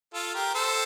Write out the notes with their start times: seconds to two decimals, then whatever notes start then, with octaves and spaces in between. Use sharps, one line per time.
0.14 F4 A4
0.34 G4 A#4
0.54 A4 C5